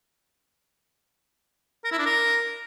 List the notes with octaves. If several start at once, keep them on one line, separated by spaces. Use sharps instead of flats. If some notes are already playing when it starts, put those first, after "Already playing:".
A#4
E4
D4
A#4